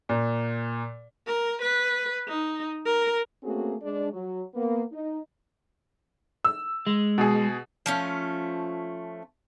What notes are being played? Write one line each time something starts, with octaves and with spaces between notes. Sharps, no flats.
A#2
A#4
B4
D#4
A#4
A3 A#3 C4 C#4 F#4 G#4
G#3 D4
F#3
A#3 B3
D#4
E6
G#3
B2 G#4
F3 A3 C#4